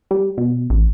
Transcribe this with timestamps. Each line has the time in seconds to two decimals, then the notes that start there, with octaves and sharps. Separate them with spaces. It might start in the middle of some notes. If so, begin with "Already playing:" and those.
0.11 G3
0.38 B2
0.70 A1